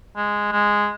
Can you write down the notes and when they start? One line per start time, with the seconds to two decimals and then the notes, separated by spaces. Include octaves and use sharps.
0.17 G#3
0.52 G#3